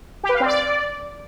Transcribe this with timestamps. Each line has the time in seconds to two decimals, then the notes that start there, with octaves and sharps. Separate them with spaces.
0.24 G4
0.29 B4
0.35 F5
0.40 C4
0.46 D5